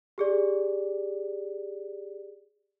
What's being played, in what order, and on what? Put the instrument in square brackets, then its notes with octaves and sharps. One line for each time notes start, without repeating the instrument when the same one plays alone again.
[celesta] G4 G#4 D5